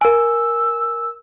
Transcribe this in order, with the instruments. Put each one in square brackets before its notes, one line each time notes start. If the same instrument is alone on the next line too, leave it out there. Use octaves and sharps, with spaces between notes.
[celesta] A#4 G#5 [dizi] E6